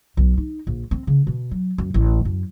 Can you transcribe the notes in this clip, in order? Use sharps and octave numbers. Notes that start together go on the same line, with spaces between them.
B1
D#4
A#1
C4
C#3
B2
F#3
F#2
A1
F#2